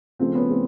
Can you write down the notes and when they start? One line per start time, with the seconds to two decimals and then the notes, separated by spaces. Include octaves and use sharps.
0.19 C#3 F3 A3 C4
0.35 B3 C#4
0.51 A3 C4